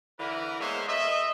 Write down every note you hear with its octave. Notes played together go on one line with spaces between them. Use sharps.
D3 E3 E4 A#4 B4
G#3 A#3 B3 C5 C#5 E5
D#5 E5